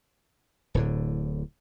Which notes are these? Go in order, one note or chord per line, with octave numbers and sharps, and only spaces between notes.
D1 A2 D3